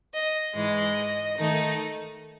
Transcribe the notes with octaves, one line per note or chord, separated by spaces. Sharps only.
D#5
G#2 E3 G#3 D#5
D#3 A3 D#4